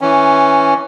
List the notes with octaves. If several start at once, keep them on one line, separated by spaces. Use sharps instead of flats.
E3 C#4